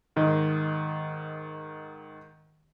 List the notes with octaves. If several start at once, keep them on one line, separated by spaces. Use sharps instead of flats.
G#2 D#3 D#5